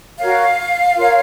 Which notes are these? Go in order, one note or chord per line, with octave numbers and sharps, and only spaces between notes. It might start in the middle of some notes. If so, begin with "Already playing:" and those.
F#4 A#4 C#5 F5
F4 A#4 C#5